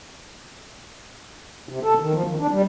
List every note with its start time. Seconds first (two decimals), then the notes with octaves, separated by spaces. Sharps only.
1.69 C3
1.83 A4
2.00 D#3
2.13 F3
2.27 D#3
2.39 D4
2.51 G3